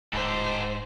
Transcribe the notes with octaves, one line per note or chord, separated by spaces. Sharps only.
D1 G#2 G4 A4 C5